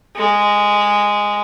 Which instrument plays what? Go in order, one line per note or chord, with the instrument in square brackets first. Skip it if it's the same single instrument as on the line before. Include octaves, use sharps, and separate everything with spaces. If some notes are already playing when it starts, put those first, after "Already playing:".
[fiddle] G#3